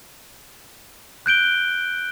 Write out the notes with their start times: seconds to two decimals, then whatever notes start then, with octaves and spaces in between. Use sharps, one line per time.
1.26 F#6 G6 D7 G7